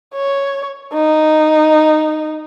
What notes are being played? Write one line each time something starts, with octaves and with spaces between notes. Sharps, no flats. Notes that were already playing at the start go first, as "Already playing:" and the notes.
C#5
D#4